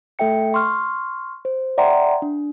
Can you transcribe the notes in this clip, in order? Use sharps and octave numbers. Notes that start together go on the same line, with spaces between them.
A3 A4 E5 G5 C#7
C6 C#6 F6
C5
D5 E5 F#5 G5 A#5 C6
D4